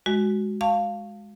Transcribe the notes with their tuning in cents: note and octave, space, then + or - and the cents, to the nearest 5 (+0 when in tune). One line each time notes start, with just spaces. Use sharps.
G#3 +0 F#4 +5
F5 +0 A5 +20 C#6 +5